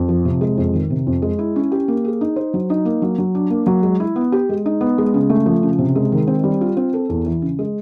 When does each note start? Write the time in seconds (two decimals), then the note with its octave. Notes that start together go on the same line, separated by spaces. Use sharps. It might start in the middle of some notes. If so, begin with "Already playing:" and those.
Already playing: F2
0.09 F3
0.25 C3
0.41 G#3
0.57 F2
0.74 D#3
0.90 C3
1.07 F2
1.22 G#3
1.39 E4
1.56 C#4
1.72 G4
1.88 A#3
2.05 G#4
2.21 D#4
2.36 C5
2.54 F#3
2.70 D#4
2.85 A#3
3.02 F#3
3.18 F#3
3.35 D4
3.50 A#3
3.67 F#3
3.83 G#3
4.00 E4
4.16 B3
4.32 G4
4.49 G#3
4.66 D#4
4.81 B3
4.98 G#3
5.14 C#3
5.30 A3
5.46 F3
5.63 C#3
5.78 C3
5.95 G#3
6.12 D#3
6.27 C4
6.44 G3
6.61 F4
6.77 C4
6.94 A4
7.09 E2
7.26 E3
7.42 C#3
7.59 G#3